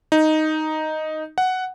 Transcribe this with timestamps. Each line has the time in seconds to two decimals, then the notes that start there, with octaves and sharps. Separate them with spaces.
0.12 D#4
1.38 F#5